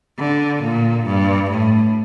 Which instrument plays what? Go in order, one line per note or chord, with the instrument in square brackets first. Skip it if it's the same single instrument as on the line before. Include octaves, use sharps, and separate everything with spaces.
[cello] D3
A#2
G2
A2